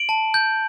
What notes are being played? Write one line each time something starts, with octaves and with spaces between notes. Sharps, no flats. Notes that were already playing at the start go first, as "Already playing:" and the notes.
Already playing: D7 F#7
A5
G6